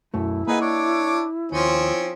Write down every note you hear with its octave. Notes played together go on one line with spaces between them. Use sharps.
B1 F#2 A3 E4
A#3 D#4 G#4 B4 D#5 F#5
D4 C#5 D6
D#2 F3 C4 C#4